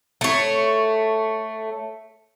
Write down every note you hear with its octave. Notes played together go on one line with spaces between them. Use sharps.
A3 C#5